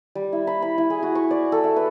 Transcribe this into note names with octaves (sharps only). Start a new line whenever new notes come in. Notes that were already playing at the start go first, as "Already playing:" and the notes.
G3
E4
B5
B5
E4
G#4
F#4
C#6
D5
A4
E5
B4